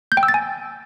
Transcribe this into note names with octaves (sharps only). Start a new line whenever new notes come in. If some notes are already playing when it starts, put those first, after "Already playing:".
G6
G5
E6
A6
G#5